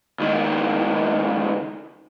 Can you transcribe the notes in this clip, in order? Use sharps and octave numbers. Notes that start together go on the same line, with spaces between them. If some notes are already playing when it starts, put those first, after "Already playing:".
C#2 D#3